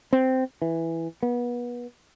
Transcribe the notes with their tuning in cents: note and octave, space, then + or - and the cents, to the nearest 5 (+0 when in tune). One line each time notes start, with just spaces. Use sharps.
C4 -10
E3 +0
B3 -30